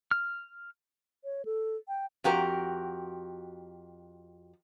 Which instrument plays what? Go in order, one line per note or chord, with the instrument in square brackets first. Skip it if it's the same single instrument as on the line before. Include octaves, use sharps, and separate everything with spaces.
[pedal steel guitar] F6
[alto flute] C#5
A4
G5
[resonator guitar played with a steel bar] F2 F#4 G4 A#4